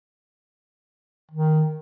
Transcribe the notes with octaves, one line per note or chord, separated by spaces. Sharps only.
D#3